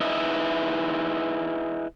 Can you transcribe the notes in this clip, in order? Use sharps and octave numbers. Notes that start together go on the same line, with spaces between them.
D#4 E4 G#4 B4 D#5 E5